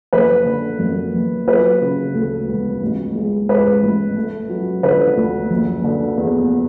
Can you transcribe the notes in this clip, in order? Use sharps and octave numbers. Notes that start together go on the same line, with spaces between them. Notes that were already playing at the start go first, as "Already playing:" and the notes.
F#1 B4
D3
F#2
F#1
F#3 B4
C#3
D2 A4
E1
A1
G#3
G#2 B4
A1
A3
F#3
D3 B4
D2
F#1
D3
E2